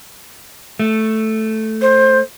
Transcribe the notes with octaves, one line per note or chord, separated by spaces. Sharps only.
A3
C5